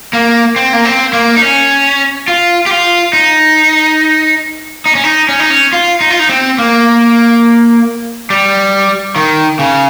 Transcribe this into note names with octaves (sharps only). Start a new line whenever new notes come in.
A#3
C4
A#3
C4
A#3
D#4
C#4
F4
G4
F4
D#4
D#4
C#4
D#4
C#4
D#4
C#4
F4
D#4
F4
D#4
C4
A#3
G3
D#3
C#3